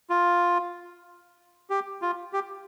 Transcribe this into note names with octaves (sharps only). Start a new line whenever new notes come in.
F4
G4
F4
G4